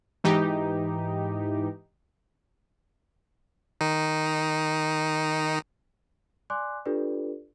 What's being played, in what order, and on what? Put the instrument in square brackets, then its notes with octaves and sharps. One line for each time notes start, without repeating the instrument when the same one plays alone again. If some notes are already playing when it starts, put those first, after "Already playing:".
[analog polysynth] G#2 E3 D#4 G4
[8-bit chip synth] D#3 D#4
[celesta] D5 G#5 C6 D6 F#6
D4 F4 G4 A4 B4 D5